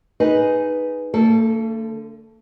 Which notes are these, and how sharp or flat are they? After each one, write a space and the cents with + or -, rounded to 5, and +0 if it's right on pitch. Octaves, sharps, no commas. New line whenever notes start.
D#4 +0 G#4 +0 B4 -5
D3 +0 A3 +45 A4 -10